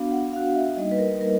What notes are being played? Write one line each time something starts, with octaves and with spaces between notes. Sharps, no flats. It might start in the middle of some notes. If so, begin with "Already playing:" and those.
Already playing: B3 D4 F#4 F5
F#5
B3 D4 F#4 F5
E5
G3 A#3 D#4 D#5
B4
A#4
G3 A#3 A#4